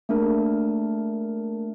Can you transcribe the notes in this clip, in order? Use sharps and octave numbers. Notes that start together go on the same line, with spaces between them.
A3 A#3 D4 G#4 A#4